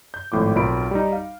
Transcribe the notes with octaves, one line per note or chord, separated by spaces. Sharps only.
G6
G#1 A2 F3 D6
B1 C4 F4 A#4 B5 D7
G3 D#4
F5